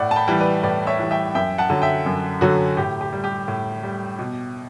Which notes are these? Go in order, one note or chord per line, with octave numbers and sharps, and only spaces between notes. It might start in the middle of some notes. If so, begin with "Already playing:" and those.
Already playing: A2 D5 F#5
A5
G5 B5
E3 G3
B4 D5
A2 B4 D5
C#5 E5
E3 G3
E5 G5
F#2 E5 G5
F#5 A5
D3 F#3
E5 G5
F#2
D3 F#3 F#4 A4
A2 G4
G4
G3
G4
A2
G3
B2